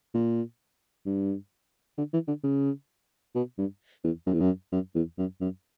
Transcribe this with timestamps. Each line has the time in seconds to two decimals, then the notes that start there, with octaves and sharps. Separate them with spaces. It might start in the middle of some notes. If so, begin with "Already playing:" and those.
0.15 A#2
1.06 G2
1.98 D3
2.13 E3
2.28 D3
2.43 C#3
3.35 B2
3.58 G2
4.04 E2
4.27 F#2
4.33 E2
4.41 F#2
4.72 F#2
4.95 E2
5.18 F#2
5.41 F#2